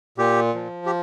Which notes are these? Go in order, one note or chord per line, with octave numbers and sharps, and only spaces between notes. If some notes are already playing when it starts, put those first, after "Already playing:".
A#2 G4
F3
G4